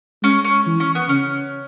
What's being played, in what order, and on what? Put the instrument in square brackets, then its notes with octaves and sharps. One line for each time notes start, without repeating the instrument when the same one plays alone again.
[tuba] G#3 [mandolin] C#4
[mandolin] C#4
[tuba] E3
[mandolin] C#4
B3
[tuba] C#3 [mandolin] C#4